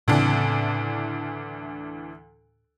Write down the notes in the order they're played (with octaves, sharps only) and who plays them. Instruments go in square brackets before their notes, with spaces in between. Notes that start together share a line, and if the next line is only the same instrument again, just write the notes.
[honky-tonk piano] D2 E3 D4 [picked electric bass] A2 C#3 C4